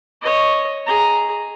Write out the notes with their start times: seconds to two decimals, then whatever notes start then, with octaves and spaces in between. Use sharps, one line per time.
0.22 C#5 D#5
0.86 G#4 A#5